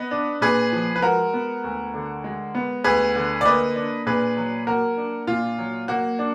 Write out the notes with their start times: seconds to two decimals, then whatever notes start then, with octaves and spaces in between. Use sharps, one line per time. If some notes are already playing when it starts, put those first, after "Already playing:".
Already playing: B3 B4 D#5
0.11 D4
0.41 A#2 G#4 B4
0.72 F3
0.96 B4
1.02 G#3 F#4 A#4
1.34 B3
1.64 D2
1.94 D3
2.24 G#3
2.55 B3
2.84 D2 G#4 B4
3.15 D3
3.41 D5
3.45 A#3 B4 D#5
3.76 D4
4.06 A#2 G#4 B4
4.37 F#3
4.67 A#3 F#4 A#4
4.97 D4
5.27 A#2 F4
5.58 F#3
5.88 A#3 F#4
6.19 D4